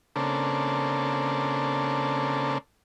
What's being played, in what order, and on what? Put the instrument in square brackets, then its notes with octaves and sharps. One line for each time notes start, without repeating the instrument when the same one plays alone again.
[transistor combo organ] C#3 A#3 C4 D4 A4